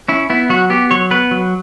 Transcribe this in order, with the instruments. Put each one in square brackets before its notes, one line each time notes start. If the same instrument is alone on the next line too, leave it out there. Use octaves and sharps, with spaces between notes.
[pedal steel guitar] C#4 E4
B3 E4
F#3 F#4
B3 G4
F#3 C#5
B3 B4
F#3